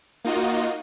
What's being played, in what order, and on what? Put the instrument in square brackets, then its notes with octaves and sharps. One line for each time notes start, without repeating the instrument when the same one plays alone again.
[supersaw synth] A#3 D#4 F4 F#4 D#5